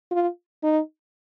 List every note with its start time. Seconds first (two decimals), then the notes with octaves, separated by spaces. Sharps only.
0.11 F4
0.63 D#4